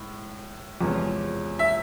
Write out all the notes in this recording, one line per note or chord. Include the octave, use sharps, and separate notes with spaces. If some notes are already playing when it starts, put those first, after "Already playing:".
Already playing: A2 G#3
E2 C3 F3 G#3 C#4
E5